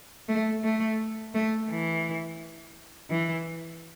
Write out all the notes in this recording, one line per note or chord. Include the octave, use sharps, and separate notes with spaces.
A3
A3
A3
E3
E3